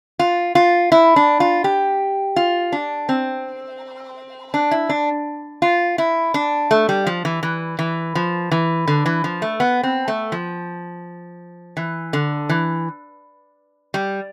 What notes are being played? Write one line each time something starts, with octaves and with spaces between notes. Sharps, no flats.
F4
F4
E4
D4
F4
G4
F4
D4
C4
D4
E4
D4
F4
E4
D4
A3
G3
F3
E3
E3
E3
F3
E3
D3
E3
F3
A3
B3
C4
A3
F3
E3
D3
E3
G3